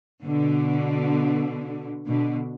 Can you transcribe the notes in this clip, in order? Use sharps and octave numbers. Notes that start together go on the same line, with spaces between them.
B2 D3
B2 D3